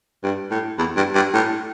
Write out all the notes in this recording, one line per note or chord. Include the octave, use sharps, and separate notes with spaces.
G2
A2
E2
G2
G2
A2